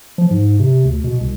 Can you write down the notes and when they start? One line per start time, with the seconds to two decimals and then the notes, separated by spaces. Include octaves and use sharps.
0.18 F3
0.31 G#2
0.59 C3
0.85 D2
1.04 B2
1.21 C2